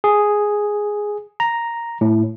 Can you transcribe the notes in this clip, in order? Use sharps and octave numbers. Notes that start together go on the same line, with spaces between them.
G#4
A#5
A2